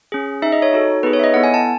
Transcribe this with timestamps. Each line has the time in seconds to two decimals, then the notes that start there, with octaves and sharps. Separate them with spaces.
0.12 C#4 G#4
0.42 D#4 E5
0.46 G#4
0.52 D#5
0.62 C#5
0.73 D#4 F#4 A4
1.03 B3 D#4 G#4 B4
1.13 C#5
1.19 E5
1.24 D#5
1.34 B3 E4 A4 F#5
1.44 G#5
1.54 A5